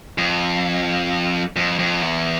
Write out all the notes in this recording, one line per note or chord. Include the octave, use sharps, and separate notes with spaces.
F2
F2
F2
E2